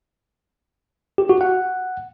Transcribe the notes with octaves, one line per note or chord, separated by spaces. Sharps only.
G4
F#4
F#5